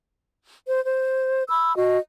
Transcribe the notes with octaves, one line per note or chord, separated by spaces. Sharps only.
C5
C5
B5 E6
F#4 D#5